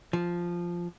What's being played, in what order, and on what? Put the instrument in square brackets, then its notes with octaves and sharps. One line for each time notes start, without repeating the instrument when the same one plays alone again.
[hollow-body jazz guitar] F3